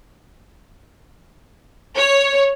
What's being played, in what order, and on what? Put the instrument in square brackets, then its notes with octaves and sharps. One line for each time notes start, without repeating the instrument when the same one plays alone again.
[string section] C#5